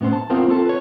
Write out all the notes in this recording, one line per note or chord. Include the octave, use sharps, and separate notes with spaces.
A2 B3 C#4 C5
A5
B3 C4 F4 A#4 C5 F5
C4 F4 A4 A5
B4 C#5